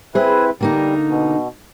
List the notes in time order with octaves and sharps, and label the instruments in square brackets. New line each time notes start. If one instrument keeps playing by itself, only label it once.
[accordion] C4 E4 B4 [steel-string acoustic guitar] G#4 C5
[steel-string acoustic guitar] D3 A#3 D#4 [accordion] G3
[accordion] B2